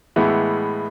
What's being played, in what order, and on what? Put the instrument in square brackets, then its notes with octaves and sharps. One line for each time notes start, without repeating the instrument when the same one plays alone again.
[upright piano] A2 E3 G#3 B3